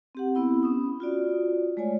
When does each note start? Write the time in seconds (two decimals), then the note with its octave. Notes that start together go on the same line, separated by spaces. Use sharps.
0.15 C4 G4 F#5
0.35 B3 C4 E4 B5
0.63 C#4 D#6
1.00 F4 F#4 D5
1.77 G#3 A3 C#5 D5 G#5